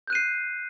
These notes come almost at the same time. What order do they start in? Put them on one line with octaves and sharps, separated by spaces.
G6 F#6 D#7 C7